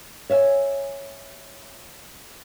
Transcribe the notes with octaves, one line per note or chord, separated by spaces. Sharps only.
C#5 E5 F5 G#5